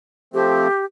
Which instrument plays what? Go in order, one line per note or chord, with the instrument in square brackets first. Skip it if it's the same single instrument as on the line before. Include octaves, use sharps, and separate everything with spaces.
[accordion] F3 A3 C4 [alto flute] G4